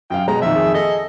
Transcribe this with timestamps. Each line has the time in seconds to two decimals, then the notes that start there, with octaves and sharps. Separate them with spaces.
0.10 F#2 F5 G5
0.27 B2 G#3 A#5
0.42 F2 A#2 D#3 E5
0.55 G#4
0.74 A4 D#5